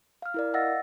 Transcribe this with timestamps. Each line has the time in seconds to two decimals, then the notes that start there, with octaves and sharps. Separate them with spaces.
0.22 F5 F6
0.34 E4 A#4 D5
0.54 D#5 F5 F#5 E6 A6 A#6